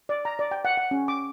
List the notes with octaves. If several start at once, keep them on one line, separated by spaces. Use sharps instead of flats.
D5
A#5
D5
G5
F#5
F#5
C#4
D6